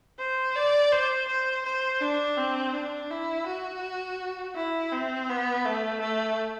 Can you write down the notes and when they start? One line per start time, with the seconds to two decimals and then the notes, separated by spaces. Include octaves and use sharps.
0.19 C5
0.55 D5
0.92 C5
1.28 C5
1.65 C5
2.01 D4
2.37 C4
2.74 D4
3.10 E4
3.46 F#4
4.56 E4
4.92 C4
5.29 B3
5.65 A3
6.01 A3